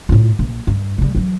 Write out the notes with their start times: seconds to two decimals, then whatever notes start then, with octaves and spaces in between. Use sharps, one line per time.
0.09 A2 F4
0.39 A#1
0.67 G2
0.98 C#3 G3
1.15 E3 F#3